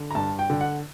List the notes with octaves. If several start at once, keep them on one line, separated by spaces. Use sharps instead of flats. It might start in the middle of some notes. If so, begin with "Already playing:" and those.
Already playing: D3
A#5
G2 A5
G5
D3
F#5